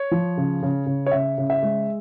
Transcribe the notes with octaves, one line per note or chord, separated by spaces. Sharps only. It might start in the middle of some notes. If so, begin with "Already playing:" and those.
Already playing: C#5
F3
C#3
C#3
C#3
C#5
C#3 E5
C#3
E5
G#3